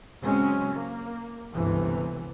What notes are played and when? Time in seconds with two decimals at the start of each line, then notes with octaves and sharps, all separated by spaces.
0.23 C#3 F#3 G#3 C4 C#4
0.74 A#3
1.54 G1 C#2 C3 E3